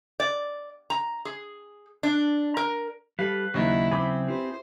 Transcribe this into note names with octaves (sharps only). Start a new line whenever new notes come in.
D5
A#5
G#4
D4
A#4
G3 G4 A4 B4 F5
D#2 C#3 F#3 D#4 E4 F#4
C4 G#4 B5 D6
F4 G4 B4 C5